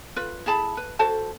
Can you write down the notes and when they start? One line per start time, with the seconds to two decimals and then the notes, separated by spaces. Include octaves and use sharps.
0.16 F4 B4
0.46 E4 G#4 A5 B5
0.77 B4
0.99 F#4 A4 C5 A5